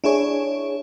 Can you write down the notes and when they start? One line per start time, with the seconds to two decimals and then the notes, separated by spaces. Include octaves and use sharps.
0.04 D4 E4 G#4 C#5